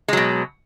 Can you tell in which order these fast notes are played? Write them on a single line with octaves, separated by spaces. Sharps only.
G#3 F#3 B2